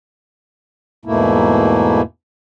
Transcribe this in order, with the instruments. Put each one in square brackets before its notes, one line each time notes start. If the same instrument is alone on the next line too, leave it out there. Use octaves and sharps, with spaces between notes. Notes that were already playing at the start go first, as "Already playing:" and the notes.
[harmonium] E2 G#2 B2 A3 A#3 E4